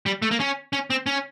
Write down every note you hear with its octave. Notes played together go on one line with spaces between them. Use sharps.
G3
A3
A#3
C#4
C#4
C4
C#4